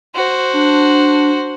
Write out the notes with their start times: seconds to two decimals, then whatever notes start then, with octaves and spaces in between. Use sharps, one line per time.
0.15 F#4 C5
0.53 D4